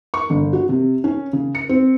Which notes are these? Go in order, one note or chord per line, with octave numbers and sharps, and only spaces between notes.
C#6
G1
F#4
C3
C#4
C#3
C#7
C4